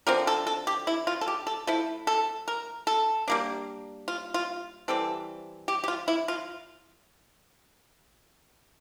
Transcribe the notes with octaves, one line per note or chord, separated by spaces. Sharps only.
D3 F3 C4 A#4
A4
A4
G4
E4
F4
A4
G4
A4
F3 A3 E4 A4
A4
A#4
A4
G3 A#3 D4
F4
F4
E3 G3 C4 A4
G4
G4
F4
E4
F4